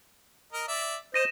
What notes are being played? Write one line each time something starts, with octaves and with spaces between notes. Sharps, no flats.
A#4 D#5
D5 E5
C5 D#5 A#6 D#7 E7